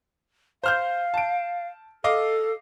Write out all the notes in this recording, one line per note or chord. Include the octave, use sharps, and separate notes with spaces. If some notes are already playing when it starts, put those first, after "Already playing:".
C5 F5 F6 G6
A5 D7
A4 D#5 F5 D6